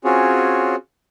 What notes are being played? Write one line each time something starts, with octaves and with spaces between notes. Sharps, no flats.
C4 C#4 F4 F#4 G#4 C#5